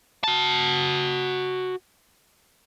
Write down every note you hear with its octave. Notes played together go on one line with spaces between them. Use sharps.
F#4 A5